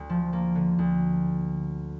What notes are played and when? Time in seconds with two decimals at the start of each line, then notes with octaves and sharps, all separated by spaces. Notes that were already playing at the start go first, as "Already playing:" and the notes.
Already playing: D2
0.09 F3
0.33 A#3
0.55 D3
0.79 D2